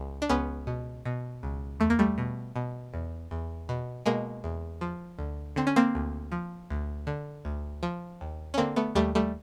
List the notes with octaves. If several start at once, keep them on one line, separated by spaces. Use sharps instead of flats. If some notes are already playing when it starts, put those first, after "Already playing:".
Already playing: C#2
D4
C#2 B3 C#4
B2
B2
C#2
E2 A3
A#3
G3 A3
B2
B2
E2
E2
B2
B2 G#3 A#3
E2
F3
D2
D3 C4
C#4
A#3 C4
D2
F3
D2
D3
D2
F3
D#2
C#4
D3 A#3 C4
A3 B3
D#2 G3 A3
G3 A3